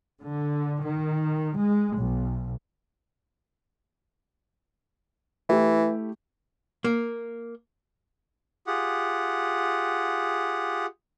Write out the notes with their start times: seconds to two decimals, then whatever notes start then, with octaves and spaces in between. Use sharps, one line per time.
0.21 D3
0.85 D#3
1.56 G#3
1.96 B1
5.49 E3 A3 E4 G4
6.84 A#3
8.67 F4 G4 G#4 F#5